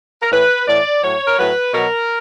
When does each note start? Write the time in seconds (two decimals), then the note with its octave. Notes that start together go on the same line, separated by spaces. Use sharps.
0.22 A#4
0.32 A2 E3 B4
0.67 A2 E3 D5
1.03 A2 F#3 C#5
1.27 A#4
1.38 A2 F#3 B4
1.74 B2 F#3 A#4